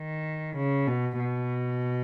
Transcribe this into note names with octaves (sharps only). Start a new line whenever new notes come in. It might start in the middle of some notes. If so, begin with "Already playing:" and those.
Already playing: D#3
C#3
B2
B2